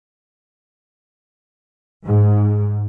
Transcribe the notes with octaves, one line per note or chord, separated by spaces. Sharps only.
G#2